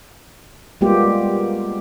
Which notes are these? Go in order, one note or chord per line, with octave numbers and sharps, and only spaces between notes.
G3 G#3 A#3 B3 F4 G4